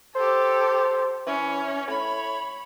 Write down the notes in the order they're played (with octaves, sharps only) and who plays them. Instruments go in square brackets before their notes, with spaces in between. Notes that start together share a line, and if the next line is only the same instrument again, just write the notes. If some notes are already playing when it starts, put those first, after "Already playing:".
[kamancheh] G4 A4 [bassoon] C5
[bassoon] E3 [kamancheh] C#4
[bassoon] A2 [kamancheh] C#5 B5